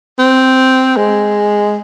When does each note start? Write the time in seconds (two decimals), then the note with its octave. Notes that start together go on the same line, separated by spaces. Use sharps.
0.19 C4
0.96 G#3